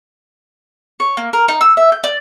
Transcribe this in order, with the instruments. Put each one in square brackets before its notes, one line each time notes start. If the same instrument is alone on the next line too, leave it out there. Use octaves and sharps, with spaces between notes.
[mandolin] C#5
A#3
A#4
D#4
E6
E5
G6
D5